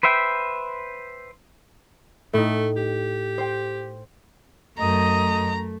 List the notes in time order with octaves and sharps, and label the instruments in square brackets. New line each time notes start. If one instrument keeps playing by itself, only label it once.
[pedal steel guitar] B4 C5 E5 G5
[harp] A2 D#4 [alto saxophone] A3
[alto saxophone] G4
[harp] C5 G5
[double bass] F#2 [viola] A3 [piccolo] D#5 [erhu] A#5